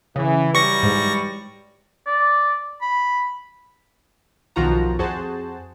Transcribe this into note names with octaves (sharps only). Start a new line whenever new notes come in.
C#3 E3
E3 F#3 G3 C#6 A#6
G#2
D5
B5
B1 D#3 F3 F#4 A#5
F2 F#4 G#4 C5 A5